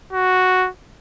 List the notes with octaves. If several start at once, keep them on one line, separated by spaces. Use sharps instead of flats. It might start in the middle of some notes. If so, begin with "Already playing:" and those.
F#4